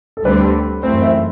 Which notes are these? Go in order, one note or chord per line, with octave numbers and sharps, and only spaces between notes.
A4
D2 D3 G3 C4 B4
F#2 E3 A3 C4 C5
E5